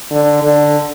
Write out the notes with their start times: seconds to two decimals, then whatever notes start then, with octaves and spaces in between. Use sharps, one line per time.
0.11 D3
0.43 D3